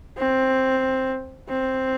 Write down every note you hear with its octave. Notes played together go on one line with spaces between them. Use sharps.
C4
C4